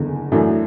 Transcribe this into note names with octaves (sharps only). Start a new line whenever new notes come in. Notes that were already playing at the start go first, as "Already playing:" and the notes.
Already playing: F#1 E2 D3
F#2 E3 A3 D4 F#4